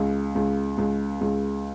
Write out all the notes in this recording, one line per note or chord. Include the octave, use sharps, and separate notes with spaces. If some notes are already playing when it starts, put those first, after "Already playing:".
Already playing: C#2
C#2
C#2
C#2